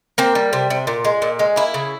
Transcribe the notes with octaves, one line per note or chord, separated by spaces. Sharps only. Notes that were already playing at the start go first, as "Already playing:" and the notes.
A#3 C4
G3
C3
C3
A#2
G#3
A#2
G#3
A#3 E4
C#3